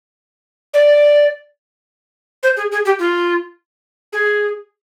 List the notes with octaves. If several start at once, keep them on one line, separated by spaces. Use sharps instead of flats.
D5
C5
G#4
G#4
G4
F4
G#4